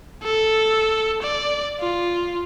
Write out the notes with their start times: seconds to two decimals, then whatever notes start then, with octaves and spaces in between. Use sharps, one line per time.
0.23 A4
1.22 D5
1.80 F4